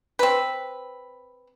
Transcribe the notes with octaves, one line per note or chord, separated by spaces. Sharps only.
C4 B4